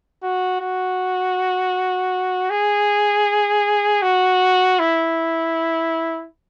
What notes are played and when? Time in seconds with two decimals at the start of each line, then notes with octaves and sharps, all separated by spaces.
0.23 F#4
0.60 F#4
2.50 G#4
4.02 F#4
4.79 E4